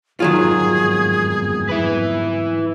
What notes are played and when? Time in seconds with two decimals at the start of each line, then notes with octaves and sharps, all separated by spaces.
0.20 G1 F2 G#2 D#3 F#3 F4 G#4
1.70 E4 B4